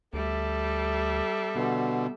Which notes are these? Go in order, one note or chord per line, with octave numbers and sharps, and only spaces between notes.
D2 G3 A4 E5
B2 D3 B3